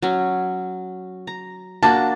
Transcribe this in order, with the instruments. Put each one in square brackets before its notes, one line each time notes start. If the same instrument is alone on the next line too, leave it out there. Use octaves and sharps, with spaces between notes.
[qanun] F#3 C#4
A#5
[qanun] A#3 D4 F#4 [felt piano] A5